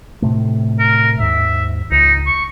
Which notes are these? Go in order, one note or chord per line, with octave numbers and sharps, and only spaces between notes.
A2 C3 A3
A#4
D#2 G#2 E5
C#2 D#4
C#6